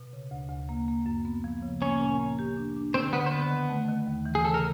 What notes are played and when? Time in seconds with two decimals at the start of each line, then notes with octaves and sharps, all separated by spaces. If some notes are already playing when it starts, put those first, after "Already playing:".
Already playing: B2
0.13 C#3
0.31 D2
0.49 D2
0.69 A#3
0.88 A#3
1.06 F#2
1.25 B3
1.44 F3
1.62 C#3
1.81 A#3 C#4 C#5
2.00 A#2
2.20 A#3
2.39 G4
2.57 D4
2.76 D4
2.94 D3 C4 C5
3.13 D3 B3 B4
3.26 C5
3.31 D3 B3 B4
3.51 D#3
3.69 A3
3.89 D#3
4.07 D#2
4.26 E3
4.35 G#4
4.45 C#3 A4
4.54 A#4